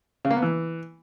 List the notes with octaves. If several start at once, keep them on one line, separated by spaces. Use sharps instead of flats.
C#3
A#3
B3
E3